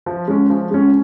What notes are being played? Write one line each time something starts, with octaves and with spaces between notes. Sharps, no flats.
F3
G#3 C#4
F3
G#3 C#4